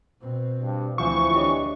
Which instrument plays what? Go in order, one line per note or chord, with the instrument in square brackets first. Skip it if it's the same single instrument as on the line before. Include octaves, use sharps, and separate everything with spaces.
[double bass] B2 C4
[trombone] G2
[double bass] D2 C4 [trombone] E3 [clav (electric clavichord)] F3 C5 F#5 [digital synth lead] C#6
[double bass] D4 [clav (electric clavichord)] G4 C#5 D#5